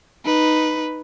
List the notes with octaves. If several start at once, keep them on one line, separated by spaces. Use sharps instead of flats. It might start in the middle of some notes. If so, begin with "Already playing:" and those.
D#4 B4